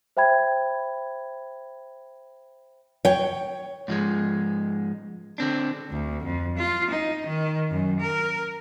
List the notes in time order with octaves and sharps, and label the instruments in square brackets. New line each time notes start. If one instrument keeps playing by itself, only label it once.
[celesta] C5 E5 G5 B5 G#6
[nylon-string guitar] C#5 G5
[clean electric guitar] G#2 F3 G#3
D3 C4 D4
[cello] D2
F2
F4
D#4
D#3
F#2
A#4